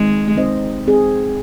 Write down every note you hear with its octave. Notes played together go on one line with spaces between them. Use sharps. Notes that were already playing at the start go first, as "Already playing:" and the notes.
Already playing: D#3 G#3 C4 D#4
G#3 C4 D#4 C5 D#5
G#3 C4 G#4